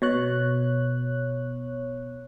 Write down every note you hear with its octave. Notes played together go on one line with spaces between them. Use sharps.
B2 C#5 F#6